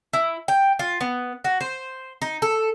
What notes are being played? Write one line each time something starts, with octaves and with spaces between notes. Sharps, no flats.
E4
G5
F4
B3
F#4
C5
D#4
A4